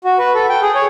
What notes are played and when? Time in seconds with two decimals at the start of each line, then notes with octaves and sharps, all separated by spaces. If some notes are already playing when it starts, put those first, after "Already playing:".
0.04 F#4
0.18 B4
0.35 A4
0.49 G5
0.62 G#4
0.75 C#5